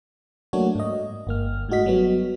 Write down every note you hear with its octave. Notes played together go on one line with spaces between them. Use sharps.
F#3 A3 A#3 D4 F#4 C#5
G#2 D#5
G1 A#3 F6
G#2 G#3 A3 F#4 D#5 B6
F#3 G3 B3 F#4